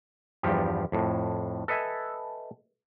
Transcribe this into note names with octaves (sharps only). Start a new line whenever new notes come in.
E2 G2 F3 G4
F2 A2
A4 B4 D#5 E5 G#5